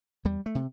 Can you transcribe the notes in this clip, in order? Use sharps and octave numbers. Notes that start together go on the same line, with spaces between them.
E2 G3
A3
C3